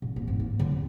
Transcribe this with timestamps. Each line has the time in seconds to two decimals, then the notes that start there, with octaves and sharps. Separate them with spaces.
0.02 A#2
0.16 A#3
0.28 G#2
0.40 A#3
0.59 D3
0.72 D#2